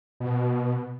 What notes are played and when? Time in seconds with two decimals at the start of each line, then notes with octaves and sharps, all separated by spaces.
0.20 B2